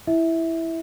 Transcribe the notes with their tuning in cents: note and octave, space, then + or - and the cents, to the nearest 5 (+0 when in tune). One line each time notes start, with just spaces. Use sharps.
E4 +0 E5 -15